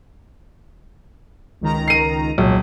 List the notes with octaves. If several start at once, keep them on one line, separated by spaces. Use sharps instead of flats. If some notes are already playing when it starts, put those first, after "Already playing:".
C#2 D#3 A#5
C7 D#7
E1 C2 A#2 F#3